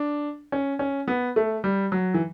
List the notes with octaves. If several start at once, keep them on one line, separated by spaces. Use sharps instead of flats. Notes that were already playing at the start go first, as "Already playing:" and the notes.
Already playing: D4
C#4
C#4
B3
A3
G3
F#3
E3